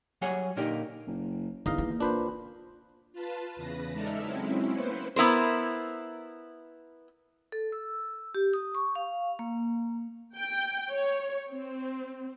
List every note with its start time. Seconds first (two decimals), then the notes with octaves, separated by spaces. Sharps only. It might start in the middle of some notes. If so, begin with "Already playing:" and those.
0.21 F#3 G3 F#4 G#4 C#5 F#5
0.56 A#2 D3 A#3 D#4 G4 D5
1.07 F#1
1.66 E2 D3 D#4 D#5 F5
1.78 A#3
2.00 A#2 D4 B4 C5
3.13 F4 B4 A5
3.56 E2 C#3 B4 A#6
3.93 G#3 D#4 A4 D5 E5 F6
4.22 F#3 G#3 C4 C#4 E4
4.73 A#3 B3 E4 B4 C5 C#7
5.16 B3 E4 A#4 C5
7.52 A4
7.72 E6
8.35 G4
8.54 D#6
8.75 C#6
8.95 F5
9.39 A#3
10.37 G5
10.91 C#5
11.52 C4